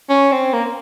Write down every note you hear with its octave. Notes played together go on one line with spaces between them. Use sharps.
C#4
C4
A#3